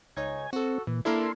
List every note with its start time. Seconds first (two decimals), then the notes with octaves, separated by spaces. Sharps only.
0.17 C#2 D#4 C#5 G#5
0.53 C4 F#4 A4
0.87 A#2 E3
1.05 A#3 D4 E4 A4 A#4 C6